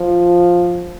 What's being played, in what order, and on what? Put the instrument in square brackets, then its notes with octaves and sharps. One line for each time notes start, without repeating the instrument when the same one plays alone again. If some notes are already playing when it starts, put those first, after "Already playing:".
Already playing: [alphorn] F3